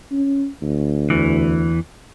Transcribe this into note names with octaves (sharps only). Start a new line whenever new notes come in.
C#4
D2
E2 E3